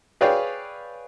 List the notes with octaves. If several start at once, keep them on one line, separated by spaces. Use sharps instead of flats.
G#4 B4 C#5 D5 F5 G5